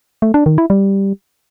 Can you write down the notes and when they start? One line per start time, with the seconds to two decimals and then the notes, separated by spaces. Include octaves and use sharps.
0.22 A3
0.34 D4
0.46 D#3
0.58 E4
0.70 G3